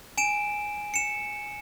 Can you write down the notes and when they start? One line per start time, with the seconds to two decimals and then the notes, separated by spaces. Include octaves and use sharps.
0.18 G#5 D7 E7
0.94 C#7 E7